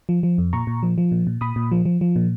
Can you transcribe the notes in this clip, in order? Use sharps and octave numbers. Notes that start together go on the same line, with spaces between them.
F3
F3
F2
A#2 A#5 C#6
A#2
F3
F3
A#2
A#2
A#2 B5 D#6
A#2
F3
F3
F3
A#2